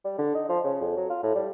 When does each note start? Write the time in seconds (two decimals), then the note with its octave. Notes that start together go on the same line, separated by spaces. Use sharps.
0.05 G3
0.19 D3
0.35 D#4
0.49 F3
0.64 C#3
0.81 F2
0.97 F#3
1.10 F4
1.23 A2
1.35 G3